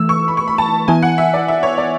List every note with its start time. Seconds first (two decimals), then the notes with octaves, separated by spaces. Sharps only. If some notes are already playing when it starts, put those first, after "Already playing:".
Already playing: E3 A3 E6
0.09 C#6
0.28 B5
0.37 C#6
0.47 B5
0.58 A5
0.88 E3 B3 E4 G#5
1.03 F#5
1.18 E5
1.34 D5
1.48 E5
1.63 C#5
1.78 D5